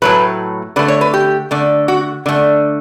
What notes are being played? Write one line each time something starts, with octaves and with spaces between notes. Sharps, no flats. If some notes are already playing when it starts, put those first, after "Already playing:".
A2 F#3 A3 B4
D3 A3 B4
C#5
B4
G4
D3 A3
F#4
D3 A3